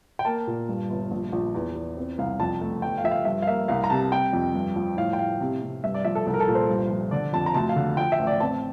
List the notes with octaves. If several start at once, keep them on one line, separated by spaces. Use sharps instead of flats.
G5
A#3 A5
A#2
G2
G1
A#1
A#1
E2
E2
C4
C2 F5
F2 A5
A3
G1 G5
F5
F3 E5
F5
G2 E5
F5
A#3 E5
C2 F5
A#5
C3 A5
G3 G5
F2
G2
F3
A2 F5
G5
A2 F5
C3
C3
G2 E5
D5
F3 E5
A4
C2 A4
A#4
A4
A#2
C5
G2
F3
D3 D5
F2 A5
A#5
D2 A5
F5
D3
F3 G5
E5
A1
D5
C4 A5